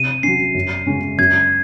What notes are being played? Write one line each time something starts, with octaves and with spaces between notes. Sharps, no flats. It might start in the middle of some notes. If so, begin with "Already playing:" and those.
Already playing: C3 D#7
F#3 C#4 C7
F#2
C#3 G#3 C#4
F#2 G#6